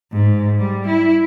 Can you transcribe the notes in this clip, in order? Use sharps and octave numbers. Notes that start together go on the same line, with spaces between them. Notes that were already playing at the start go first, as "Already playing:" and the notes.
G#2
G3
E4